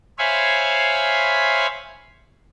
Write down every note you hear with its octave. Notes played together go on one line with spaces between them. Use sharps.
C5 C#5 E5 F5 G#5 B5